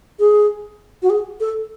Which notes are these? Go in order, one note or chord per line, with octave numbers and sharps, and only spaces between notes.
G#4
F#4
G#4
A4